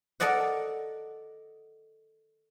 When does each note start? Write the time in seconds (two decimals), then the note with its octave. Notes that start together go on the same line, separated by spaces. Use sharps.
0.20 A4 A#4 D5 D#5 F#5